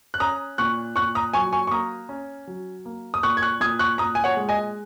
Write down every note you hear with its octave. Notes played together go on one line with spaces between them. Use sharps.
F#6
C#4 A#5 D#6
A#2 C#6 F#6
A#2 C#6 F#6
A#5 D#6
F#3 G#5 C#6
G#5 C#6
C#6
A#3 A#5 D#6
C#4
F#3
A#3
D#6
A#2 C#6 F#6
G#6
C#6 F#6
A#2 D#6 G#6
C#6 F#6
A#2 A#5 D#6
G#5
C#5 F#5
G#3
D#5 G#5